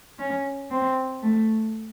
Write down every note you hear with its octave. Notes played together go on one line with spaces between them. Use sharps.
C#4
C4
A3